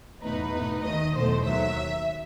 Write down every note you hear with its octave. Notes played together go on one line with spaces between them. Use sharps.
E2 B2 A3 D#4 B4
B2 A3 D#4
D#2 D#3 A3 D#5
E2 B2 F#3 A3 C5
D#2 D#3 F#3 E5